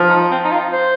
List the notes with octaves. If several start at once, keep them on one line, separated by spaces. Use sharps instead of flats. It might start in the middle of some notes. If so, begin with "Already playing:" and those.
Already playing: F3
D#4
C4
D#4
F4
C5